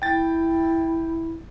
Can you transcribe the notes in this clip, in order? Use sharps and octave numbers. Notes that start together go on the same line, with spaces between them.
E4 G5 A6